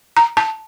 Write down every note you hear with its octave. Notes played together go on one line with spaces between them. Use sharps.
A#5
A5